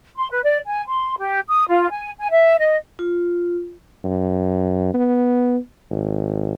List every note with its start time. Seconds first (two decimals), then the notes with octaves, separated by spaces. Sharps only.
0.16 C6
0.30 B4
0.43 D5
0.67 G#5
0.88 C6
1.18 G4
1.48 D#6
1.68 F4
1.91 G#5
2.18 G#5
2.32 E5
2.59 D#5
2.99 F4
4.04 F#2
4.94 B3
5.91 G#1